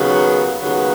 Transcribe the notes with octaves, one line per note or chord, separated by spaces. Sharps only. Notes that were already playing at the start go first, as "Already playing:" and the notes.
Already playing: D#2 C#3 F#3 B3
D#2 C#3 F#3 B3